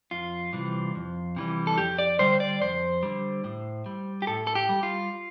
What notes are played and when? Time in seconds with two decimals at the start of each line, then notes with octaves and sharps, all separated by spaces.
0.11 F2 F4
0.53 C3 E3 G3
0.95 F2
1.36 C3 E3 G3
1.67 A4
1.78 F2 G4
1.98 D5
2.19 D3 G3 C5
2.40 D5
2.62 F2 C5
3.03 D3 G3
3.44 A2
3.86 G3
4.22 G4
4.27 A2 A4
4.47 A4
4.55 G4
4.69 G3
4.83 F4